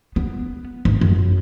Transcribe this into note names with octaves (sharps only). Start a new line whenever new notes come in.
B3
G#1
F#2